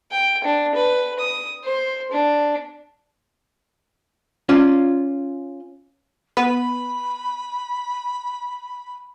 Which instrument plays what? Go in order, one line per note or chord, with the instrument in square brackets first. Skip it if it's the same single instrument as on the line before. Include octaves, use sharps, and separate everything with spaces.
[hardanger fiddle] G5
D4
B4
D#6
C5
D4
[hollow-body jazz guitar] C#4 F4 D5
[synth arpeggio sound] B3 B4 [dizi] B5